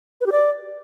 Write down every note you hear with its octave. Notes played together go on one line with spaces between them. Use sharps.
B4
G4
D5